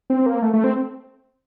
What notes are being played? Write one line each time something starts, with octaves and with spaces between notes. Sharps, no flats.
C4
A#3
A3
A3
C4